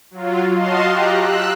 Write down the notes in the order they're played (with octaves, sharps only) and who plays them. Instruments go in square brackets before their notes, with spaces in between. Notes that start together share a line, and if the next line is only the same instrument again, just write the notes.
[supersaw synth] F#3 F4
F#4 D#5 F5 A5 C6
G4 A#5 F#6
E6 F#6